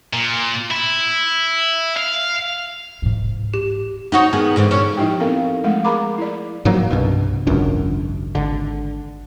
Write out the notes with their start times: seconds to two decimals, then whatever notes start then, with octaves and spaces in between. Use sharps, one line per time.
0.13 A#2
0.71 E4
1.97 F5
3.02 G#2 E3
3.54 G4
4.12 D#4 F#4 C#5
4.33 D#3 B3 G#4
4.56 G#2 D3 E3
4.71 A#2 C#4
4.97 F3 D#4 E4 G4 G5
5.20 B3 C4 A4 A#4 F5
5.64 F3 G#3 A3 F5
5.85 G#4 A#4 A#5 B5 D6
6.18 E4 D5
6.65 G#2 F3 F#3 A#3
6.91 C2 G2 B2
7.47 G#1 C#2 F#2 D4
8.35 G#1 D3